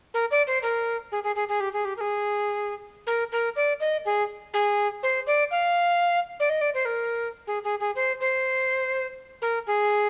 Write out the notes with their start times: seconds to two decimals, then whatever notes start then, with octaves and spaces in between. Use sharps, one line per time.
0.14 A#4
0.31 D5
0.47 C5
0.62 A#4
1.12 G#4
1.23 G#4
1.36 G#4
1.48 G#4
1.60 G4
1.73 G#4
1.85 G4
1.97 A#4
2.01 G#4
3.07 A#4
3.32 A#4
3.56 D5
3.80 D#5
4.05 G#4
4.53 G#4
5.03 C5
5.27 D5
5.51 F5
6.40 D5
6.49 D#5
6.61 D5
6.74 C5
6.85 A#4
7.47 G#4
7.64 G#4
7.80 G#4
7.95 C5
8.20 C5
9.42 A#4
9.67 G#4